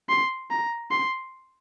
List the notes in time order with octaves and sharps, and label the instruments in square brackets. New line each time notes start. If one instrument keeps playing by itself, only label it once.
[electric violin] C6
A#5
C6